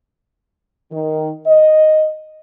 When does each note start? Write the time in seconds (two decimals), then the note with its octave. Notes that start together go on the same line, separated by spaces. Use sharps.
0.91 D#3
1.46 D#5